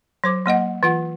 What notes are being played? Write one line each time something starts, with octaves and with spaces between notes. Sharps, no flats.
F#3 C5 D6
F#3 A#3 D#5 F#5
E3 F4 F#5